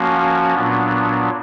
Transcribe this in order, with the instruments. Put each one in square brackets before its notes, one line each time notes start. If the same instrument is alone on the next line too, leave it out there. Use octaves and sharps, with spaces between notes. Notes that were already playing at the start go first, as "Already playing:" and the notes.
Already playing: [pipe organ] F3 A#3 C#4 F#4
A#2 F#3 B3 D4